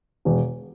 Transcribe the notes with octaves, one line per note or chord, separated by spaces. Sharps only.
E1